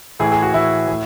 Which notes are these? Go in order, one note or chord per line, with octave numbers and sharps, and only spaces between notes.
A2 E3 G#4
G#4
F#4
A2 E3 E4
A2